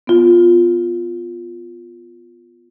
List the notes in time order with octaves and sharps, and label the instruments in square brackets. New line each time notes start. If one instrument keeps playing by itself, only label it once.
[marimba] B3 F4